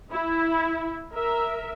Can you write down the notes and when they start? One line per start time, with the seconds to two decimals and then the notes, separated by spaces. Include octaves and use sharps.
0.12 E4
1.14 A#4 E5